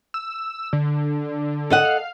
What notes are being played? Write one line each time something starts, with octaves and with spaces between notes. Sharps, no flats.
E6
D3
A4 D#5 F#5
F5